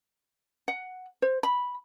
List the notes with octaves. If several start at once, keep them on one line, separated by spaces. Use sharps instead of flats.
F#5
C5
B5